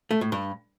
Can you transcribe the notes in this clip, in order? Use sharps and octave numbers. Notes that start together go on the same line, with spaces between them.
A3
A2
G2